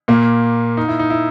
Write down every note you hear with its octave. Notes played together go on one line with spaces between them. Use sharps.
A#2 A#3
D#4
E4
D#4
E4